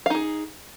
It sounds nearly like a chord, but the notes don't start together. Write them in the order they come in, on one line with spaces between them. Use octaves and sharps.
F5 D#4 G#4